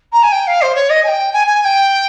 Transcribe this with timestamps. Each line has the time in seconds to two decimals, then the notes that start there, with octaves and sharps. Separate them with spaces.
0.12 A#5
0.23 G#5
0.32 G5
0.47 F5
0.62 C5
0.75 C#5
0.90 D#5
1.04 G#5
1.07 G5
1.33 G#5
1.47 G#5
1.61 G#5
1.64 G5